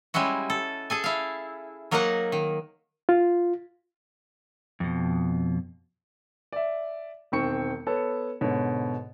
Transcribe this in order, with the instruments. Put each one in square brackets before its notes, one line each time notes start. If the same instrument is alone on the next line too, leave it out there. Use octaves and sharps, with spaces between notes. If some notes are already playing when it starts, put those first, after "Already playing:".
[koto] G3 G#3 C#4 E4 F#4
A4
G#4 A4 G#5
E4 F5
F#3 A#3 D#4 A#4 C#5 F#5
D#3
[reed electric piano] F4
[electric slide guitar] F2 B2
[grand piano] D5 E5
E1 D#3 C4 C#6 C#7
B3 A4 C#5
G#2 B2 D3 C#5